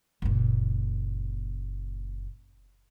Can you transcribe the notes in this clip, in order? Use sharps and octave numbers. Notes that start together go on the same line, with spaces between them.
F#1 A#2